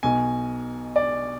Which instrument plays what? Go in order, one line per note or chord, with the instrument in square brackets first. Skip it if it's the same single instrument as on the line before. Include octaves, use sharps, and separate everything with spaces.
[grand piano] B1 B2 G#5
D5